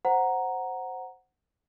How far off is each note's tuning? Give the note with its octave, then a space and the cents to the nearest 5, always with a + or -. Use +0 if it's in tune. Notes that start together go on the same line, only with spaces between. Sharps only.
C5 +0 F#5 +0 A#5 +0